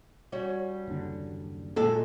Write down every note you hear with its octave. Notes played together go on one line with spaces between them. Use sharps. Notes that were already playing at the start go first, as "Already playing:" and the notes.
G3 C#4 F#4
F#1 D#2 D3
F#2 A#2 G#3 A4